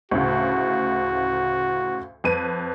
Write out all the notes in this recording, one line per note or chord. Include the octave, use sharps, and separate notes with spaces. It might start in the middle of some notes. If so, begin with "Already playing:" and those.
D2 A2 C#3 F#4
F2 B4 D#7